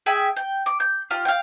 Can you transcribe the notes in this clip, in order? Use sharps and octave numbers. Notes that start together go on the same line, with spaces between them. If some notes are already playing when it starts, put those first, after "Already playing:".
G#4 E5 G5 G#5
G5
D6
G6
F4 G4
F5 G5